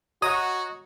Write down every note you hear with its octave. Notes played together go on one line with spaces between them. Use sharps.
F#4 C#5 D#5 A#5 D#6